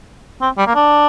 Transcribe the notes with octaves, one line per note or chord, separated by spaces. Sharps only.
C4
G3
A#3
D4